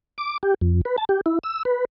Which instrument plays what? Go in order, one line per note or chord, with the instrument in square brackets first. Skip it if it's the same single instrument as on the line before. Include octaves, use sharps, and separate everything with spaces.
[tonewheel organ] D6
G4
F2
B4
A5
G4
E4
E6
B4